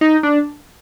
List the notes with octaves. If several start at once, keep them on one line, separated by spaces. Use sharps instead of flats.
D#4
D4